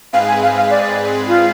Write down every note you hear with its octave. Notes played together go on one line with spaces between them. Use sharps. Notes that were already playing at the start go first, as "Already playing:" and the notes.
G#2 G#3 C4 G#4 B4 F5
G#5
F5
F5
D5
F4